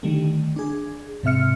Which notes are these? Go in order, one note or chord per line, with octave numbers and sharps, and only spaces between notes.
D3 D#3 G3 A3
D4 G#4
G#2 C3 C4 E5 F6 C#7